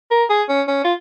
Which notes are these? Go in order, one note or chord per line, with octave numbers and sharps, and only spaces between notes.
A#4
G#4
C#4
C#4
F4